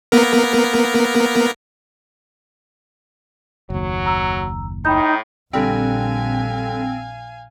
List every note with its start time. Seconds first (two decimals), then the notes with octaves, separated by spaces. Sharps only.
0.12 A#3 B3 A#4
3.70 F#1 D#2 F#3
4.06 A#5 E6
4.85 A2 D#4 G5 B5 G6
5.53 A#1 D3 G3 C4 F5 G#5